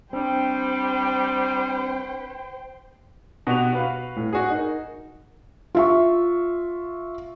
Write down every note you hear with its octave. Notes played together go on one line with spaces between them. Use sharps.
G3 C4 D4 C5 G5
B2 F#4 G4 F7
F#4 B4 F5
A2
F#4 G#4
D#4 A#4
F4 E5 C#6